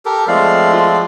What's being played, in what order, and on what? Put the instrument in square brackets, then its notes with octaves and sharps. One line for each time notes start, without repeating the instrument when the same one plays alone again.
[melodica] G4 A4 A#4
[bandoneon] F3 G#3 [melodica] A3 C4 D5 [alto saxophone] F5
[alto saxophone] F4